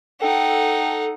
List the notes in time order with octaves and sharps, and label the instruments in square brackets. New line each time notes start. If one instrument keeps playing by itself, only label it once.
[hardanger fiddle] D#4 F#5 [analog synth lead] A4 [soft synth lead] G5